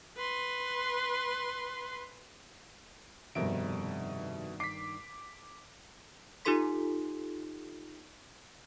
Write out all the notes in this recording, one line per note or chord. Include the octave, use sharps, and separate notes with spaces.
B4 C6
F1 G2 B2 D#3 E5 D7
D6 B6 C7
D#4 F4 G4 A4 C6 B6